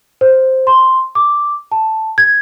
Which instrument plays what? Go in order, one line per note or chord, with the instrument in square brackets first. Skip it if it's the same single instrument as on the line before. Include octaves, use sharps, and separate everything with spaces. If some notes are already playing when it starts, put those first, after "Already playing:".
[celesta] C5
C6
D6
A5
G#6